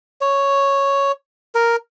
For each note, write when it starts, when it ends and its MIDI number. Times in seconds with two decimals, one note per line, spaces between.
0.21 1.12 73
1.55 1.76 70